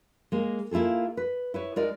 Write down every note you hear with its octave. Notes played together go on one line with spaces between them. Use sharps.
G#3 A#3
A#3 E4 F4 G#4 A4
B4
E4 B4 C#5
G#3 D#4 A#4 D5